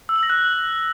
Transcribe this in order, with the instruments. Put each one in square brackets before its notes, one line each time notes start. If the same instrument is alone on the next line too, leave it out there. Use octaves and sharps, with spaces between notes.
[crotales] E6
F#7
A#6
F#6